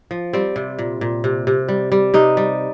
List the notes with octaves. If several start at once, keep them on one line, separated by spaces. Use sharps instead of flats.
F3
G3 C4
C3
A#2
A#2
C3
C3
G3
G3
C3 D#4
G3